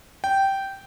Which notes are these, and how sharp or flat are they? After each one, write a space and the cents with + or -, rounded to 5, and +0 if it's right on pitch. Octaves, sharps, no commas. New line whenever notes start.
G5 -10